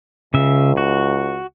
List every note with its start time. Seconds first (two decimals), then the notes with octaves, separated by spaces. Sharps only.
0.34 C#2 C#3 E5
0.77 F#4